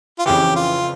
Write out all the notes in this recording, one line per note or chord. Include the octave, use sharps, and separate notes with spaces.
F4
F2 C#3 E3 G4
F4